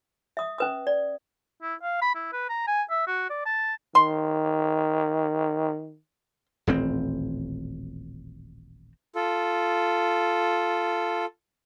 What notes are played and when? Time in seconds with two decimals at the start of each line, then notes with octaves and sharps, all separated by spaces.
0.37 E5 D#6
0.58 C#4 B4 D#6
0.87 D5
1.62 E4
1.83 F5
2.02 B5
2.15 E4
2.33 B4
2.49 A#5
2.67 G#5
2.90 E5
3.07 F#4
3.30 D5
3.46 A5
3.95 D#3 C6
6.67 D#1 A1 C4
9.15 F4 A4